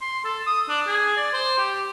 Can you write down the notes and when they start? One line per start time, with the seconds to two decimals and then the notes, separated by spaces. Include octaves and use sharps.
0.01 C6
0.25 A4
0.47 D#6
0.69 D4
0.87 G#4
1.17 D5
1.33 C5
1.58 G4